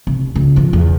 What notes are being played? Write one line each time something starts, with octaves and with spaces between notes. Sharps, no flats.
C2
C#2
B2 F3
E2